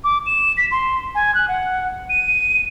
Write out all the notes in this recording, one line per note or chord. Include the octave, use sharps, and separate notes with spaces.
D6
E7
B6
C6
G#5
F#6
F#5
D#7